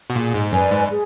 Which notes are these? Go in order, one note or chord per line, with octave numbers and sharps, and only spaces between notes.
B2
A#2 G#4
G#2
F#2 B4 D5 G#5
G#2
G#4